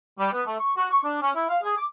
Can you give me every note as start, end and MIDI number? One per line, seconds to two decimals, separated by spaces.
0.19 0.30 55
0.32 0.41 59
0.46 0.56 57
0.59 0.73 85
0.76 0.86 66
0.91 1.03 85
1.04 1.19 62
1.22 1.30 61
1.35 1.45 64
1.50 1.58 77
1.63 1.77 68
1.78 1.86 86